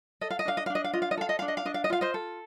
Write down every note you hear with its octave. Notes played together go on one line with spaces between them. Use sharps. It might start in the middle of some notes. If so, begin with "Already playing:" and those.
A4 D#5
F5
D#5
D4 F5
D#5
F5
D4
D#5
F5
F4 D#5
F5
D#5
A4 F5
D#5
D4 F5
D#5
F5
D4 D#5
F5
D#5
F4 F5
C5 D#5
A4